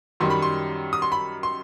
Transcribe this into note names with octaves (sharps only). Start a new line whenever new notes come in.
F#2 D#3 G3 C6
B5
C6
D#6
C6
B5
C6